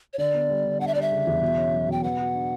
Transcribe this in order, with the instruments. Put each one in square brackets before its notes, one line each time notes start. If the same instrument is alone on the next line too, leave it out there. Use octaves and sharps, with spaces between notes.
[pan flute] C#5
[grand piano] D3 [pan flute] D5
[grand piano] B3
G3
D3
[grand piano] D4 [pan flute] F#5
[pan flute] E5
[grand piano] G3 [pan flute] D5
[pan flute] E5
[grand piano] C#3
E2
B2
C#4
F#3
[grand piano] B2 [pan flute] G5
[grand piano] B4 [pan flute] F#5
[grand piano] F#4
D4